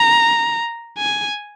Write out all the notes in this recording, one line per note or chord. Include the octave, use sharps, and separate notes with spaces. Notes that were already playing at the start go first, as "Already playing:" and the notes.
Already playing: A#5
G#5